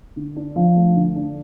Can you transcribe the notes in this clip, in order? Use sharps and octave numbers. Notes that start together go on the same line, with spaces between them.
D3
D4
F3
A3
D3
D4